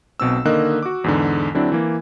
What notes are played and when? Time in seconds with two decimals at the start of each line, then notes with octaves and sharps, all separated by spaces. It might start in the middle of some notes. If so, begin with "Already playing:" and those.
0.20 B1 B2 C4 E6
0.45 D3 D#3 A#3 D#5 F#6
0.82 F#4 D6
1.04 E2 G#2 D3
1.54 D3 F#3 C4 D4 E4
1.72 E3 A#3